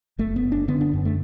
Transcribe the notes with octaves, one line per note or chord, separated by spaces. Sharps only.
F#1 A3
B3
F#1
D4
D3 B3
D4
F#2
A3